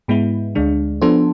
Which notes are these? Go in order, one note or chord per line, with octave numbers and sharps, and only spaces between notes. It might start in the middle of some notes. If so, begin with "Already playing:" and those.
G#2 G#3 B3 E4
D2 D3 G#3 D4
F3 B3 D4 A4 C5